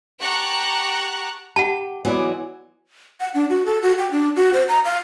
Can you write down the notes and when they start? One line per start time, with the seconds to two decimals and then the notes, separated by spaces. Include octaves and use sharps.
0.21 G4 F#5 A5 A#5 C#6 F#6
1.56 G4 F#5 A5
2.05 E3 F#3 G#3 B3 E4 D5
3.20 F#5
3.34 D4
3.50 F#4
3.66 A4
3.82 F#4
3.99 G5
4.11 D4
4.36 F#4
4.53 C5
4.68 A#5
4.85 F5